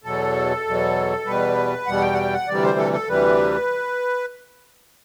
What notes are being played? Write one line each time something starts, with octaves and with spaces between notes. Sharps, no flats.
E2 B2 F#3 A4
E2 B2 F#3
E2 B2 G3 B4
E2 B2 G3 F#5
G5
F#5
G5
F#5
D2 C3 E3 G3 D5
C5
A4
A4
D2 C3 E3 G3 B4